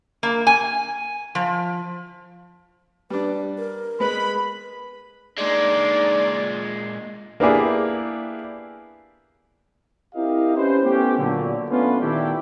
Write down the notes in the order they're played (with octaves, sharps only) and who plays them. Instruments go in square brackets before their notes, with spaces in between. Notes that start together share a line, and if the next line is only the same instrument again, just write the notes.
[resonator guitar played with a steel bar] A#3
G#5
F3
[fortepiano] G3 D4 [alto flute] B4
[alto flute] A#4
[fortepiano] G#3 B3 B4 [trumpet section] B5
[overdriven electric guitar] A#2 G#3 [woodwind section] D4 D#4 D5
[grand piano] A#3 B3 D4 E4 G4 G#4
[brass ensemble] C4 E4 G4 A#4 D#5 F5
C#4 G4 B4 C5
A3 B3 C#4 G4
A#2 D3 F#3
A3 B3 C#4 D4 F4 B4
A#2 D#3 A3 E4 G4